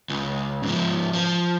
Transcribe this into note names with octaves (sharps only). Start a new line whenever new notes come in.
C#2
G#2 F3
F3